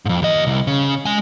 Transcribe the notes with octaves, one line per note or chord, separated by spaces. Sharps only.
F2 G#2
D#2 D#5
C2
C#3
G#3 G#5